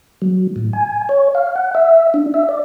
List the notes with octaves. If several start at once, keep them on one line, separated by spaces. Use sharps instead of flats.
F#3
A2
G#5
C#5
F5
F#5
E5
D4
E5
D5